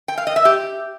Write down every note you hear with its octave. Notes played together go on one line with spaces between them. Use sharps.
G5
F5
D#5
E5
G4